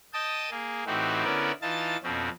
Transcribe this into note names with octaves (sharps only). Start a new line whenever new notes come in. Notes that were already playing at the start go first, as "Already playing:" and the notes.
D#5 G5 A5 D#6
A#3 G#4
A2 E3 C4 D#4 F#4 G4
D3 B3 C#4 E4 A#4 D5
E3 D#4 F4 A5 A6
F2 B2 C4 C#4